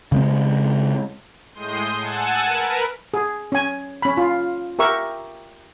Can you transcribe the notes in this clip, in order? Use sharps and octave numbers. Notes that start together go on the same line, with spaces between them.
C#3 G#3 C4
A2 G#3 C6 D#6 G6
F#5 G#5 A5 E6
A#4 B4
G#4
C#4 G#5
C#4 B5
F4
G4 A#4 E5 C#6